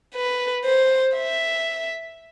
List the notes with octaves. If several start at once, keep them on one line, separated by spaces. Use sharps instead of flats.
B4
C5
E5